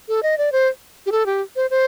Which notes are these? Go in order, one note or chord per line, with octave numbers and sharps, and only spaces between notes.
A4
D#5
D5
C5
G4
A4
G4
C5
C5